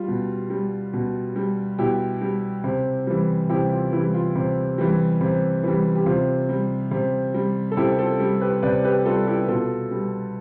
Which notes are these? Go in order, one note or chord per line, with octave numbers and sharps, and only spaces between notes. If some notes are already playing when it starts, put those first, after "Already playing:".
Already playing: G3 F4
B2
G3
B2
G3
B2 E4 G4
G3
C3
E3 G3
C3 E4 G4
F4
E3 G3 E4
F4
C3
E3 G3
C3
E3 G3
G4
C3 F4
G3
C3
G3
A4
C3 E4 G4
F4 A4
G3
G4 B4
C3 B4 D5
G4 B4
G3 F4 A4
E4 G4
B2 F4 A4
G3